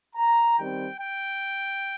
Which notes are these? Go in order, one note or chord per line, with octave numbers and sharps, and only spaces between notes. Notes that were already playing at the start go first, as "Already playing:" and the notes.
A#5
D#3 G3 C4 G5
G5